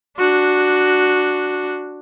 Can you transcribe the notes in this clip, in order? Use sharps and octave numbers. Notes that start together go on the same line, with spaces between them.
D4 F#4